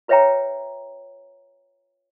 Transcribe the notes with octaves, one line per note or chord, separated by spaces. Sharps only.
F4 B4 C#5 E5 G5 A#5